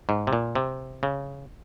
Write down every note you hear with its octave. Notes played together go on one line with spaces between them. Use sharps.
G#2
C3
A#2
C3
C#3